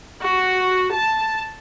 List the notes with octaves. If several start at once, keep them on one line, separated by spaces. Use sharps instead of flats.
F#4
A5